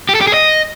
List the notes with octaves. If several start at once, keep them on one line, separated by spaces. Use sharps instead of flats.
G4
A4
G4
G#4
D#5